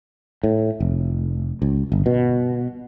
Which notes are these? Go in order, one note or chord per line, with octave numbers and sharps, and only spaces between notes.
A2
F1
C#2
G1
B2